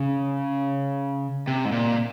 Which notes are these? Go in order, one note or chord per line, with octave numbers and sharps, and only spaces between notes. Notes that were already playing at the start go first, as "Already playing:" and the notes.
Already playing: C#3
C3
G#2
A#2